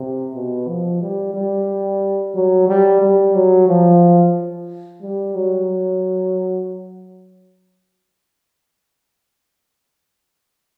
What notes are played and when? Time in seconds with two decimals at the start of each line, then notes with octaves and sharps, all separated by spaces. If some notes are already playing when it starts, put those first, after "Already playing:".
Already playing: C3
0.35 B2
0.68 F3
1.02 G3
1.34 G3
2.34 F#3
2.68 G3
3.01 G3
3.35 F#3
3.68 F3
5.02 G3
5.35 F#3